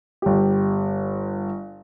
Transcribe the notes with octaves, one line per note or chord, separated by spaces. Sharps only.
G1 G4